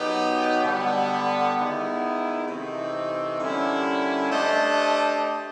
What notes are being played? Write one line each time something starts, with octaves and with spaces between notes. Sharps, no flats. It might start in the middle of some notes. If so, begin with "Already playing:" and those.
Already playing: B2 F#3 B3 D#4 G4
D3 G3 B3
D#3 G#3 B3 E4
C3 E3 A3 C4 D#4
D3 G3 A#3 C#4 E4
A3 D4 G4 C5 D#5